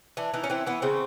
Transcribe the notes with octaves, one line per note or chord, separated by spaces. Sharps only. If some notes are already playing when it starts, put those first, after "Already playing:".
E3 D4
E3 D#4
C#4
E3 C4
E3 B3
C#3 C4